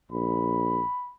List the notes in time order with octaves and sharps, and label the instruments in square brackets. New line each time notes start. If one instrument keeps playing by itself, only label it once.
[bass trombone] A#1 [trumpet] B5